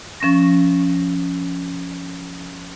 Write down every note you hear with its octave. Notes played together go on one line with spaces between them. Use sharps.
F3 C#4 C#6 A#6